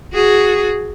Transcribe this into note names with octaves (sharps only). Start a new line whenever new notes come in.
F#4 G#4